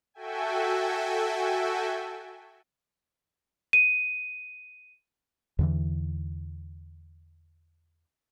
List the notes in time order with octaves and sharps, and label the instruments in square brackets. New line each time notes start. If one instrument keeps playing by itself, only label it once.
[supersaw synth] F#4 A4 E5 G5 G#5
[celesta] D#7
[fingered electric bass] E2 D3 E3